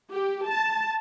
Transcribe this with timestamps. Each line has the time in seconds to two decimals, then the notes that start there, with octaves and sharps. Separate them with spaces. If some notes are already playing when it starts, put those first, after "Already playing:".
0.11 G4
0.48 A5